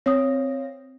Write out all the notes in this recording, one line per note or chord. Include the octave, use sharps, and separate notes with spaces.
C4 C#5 F5 D#6 A#6